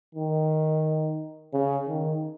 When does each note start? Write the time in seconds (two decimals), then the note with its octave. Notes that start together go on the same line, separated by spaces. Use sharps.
0.15 D#3
1.53 C#3
1.89 D#3